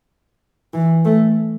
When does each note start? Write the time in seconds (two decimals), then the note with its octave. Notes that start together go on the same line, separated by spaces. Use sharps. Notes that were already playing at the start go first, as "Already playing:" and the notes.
0.74 E3
1.05 A3